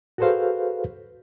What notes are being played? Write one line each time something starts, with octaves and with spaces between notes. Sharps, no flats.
F#4 G#4 A4 B4 C5 F5